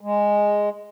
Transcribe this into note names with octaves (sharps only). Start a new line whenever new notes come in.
G#3